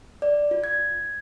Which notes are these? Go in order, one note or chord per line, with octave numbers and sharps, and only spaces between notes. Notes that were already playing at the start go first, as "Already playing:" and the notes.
D5
F4
G#6